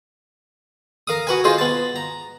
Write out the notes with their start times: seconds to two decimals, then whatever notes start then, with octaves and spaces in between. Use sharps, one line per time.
1.08 A#4 F5 D#6
1.27 F#4 B4 G#5
1.44 F4 G#4 C5 D#5
1.58 B3 A5
1.96 A#5